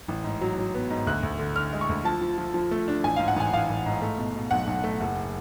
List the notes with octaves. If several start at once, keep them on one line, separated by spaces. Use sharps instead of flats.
A1
G#2
F#3
F#3
B3
G#2
D2 F#6
D2
D3
D3 F6
G#3
C#6
D2
F3 A5
F3
F3
F3
A3
D4
A1 G#5
G#2 F5
F#5
A1 G#5
A1 F5
A1
G#2
A3
B2
B2
B1 F#5
B1
A3
F#1